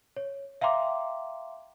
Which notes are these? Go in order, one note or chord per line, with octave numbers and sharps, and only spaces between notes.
C#5
E5 F5 G5 A#5 C6 D6